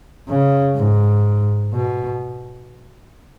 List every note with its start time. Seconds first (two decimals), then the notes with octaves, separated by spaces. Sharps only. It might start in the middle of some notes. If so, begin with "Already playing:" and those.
0.28 C#3
0.76 G#2
1.73 B2